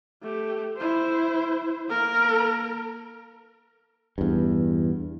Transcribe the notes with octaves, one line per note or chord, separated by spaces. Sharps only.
A3 G4
E4 C5
A#3 A#4
E2 G2